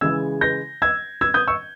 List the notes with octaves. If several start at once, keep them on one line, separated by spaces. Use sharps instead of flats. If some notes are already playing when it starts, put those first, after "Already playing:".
C#3 E3 G#3 E6 G#6
G6 A#6
E6 G#6
E6 G#6
D#6 G6
C#6 E6